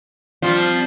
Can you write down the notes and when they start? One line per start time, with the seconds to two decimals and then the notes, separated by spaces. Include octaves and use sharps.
0.42 F3 G3 C4 F4